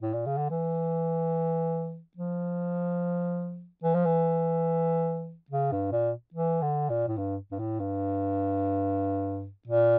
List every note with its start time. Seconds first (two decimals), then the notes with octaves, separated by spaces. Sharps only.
0.02 A2
0.14 A#2
0.26 C#3
0.38 D3
0.50 E3
2.17 F3
3.84 E3
3.95 F3
4.05 E3
5.51 C#3
5.72 G2
5.92 A#2
6.34 E3
6.62 D3
6.90 A#2
7.08 A2
7.17 G2
7.52 G2
7.59 A2
7.80 G2
9.67 A#2